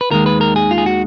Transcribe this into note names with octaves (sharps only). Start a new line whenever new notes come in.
B4
D#2 D#3 G#3 A#4
B4
A#4
G#4
F4
G#4
F#4